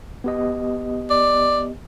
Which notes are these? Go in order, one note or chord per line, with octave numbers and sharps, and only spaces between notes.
B3 G4 D#5
D5